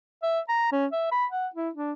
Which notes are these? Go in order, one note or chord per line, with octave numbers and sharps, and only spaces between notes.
E5
A#5
C#4
E5
B5
F#5
E4
D4